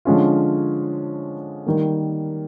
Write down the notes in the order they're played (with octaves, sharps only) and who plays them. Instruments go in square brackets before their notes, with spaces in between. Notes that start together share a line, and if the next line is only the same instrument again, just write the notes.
[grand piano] D3 F3 G#3 C#4 F4
D#3 G3 A#3